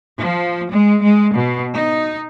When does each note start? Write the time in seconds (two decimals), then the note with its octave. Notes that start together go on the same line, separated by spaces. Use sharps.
0.19 F3
0.70 G#3
1.00 G#3
1.33 B2
1.73 D#4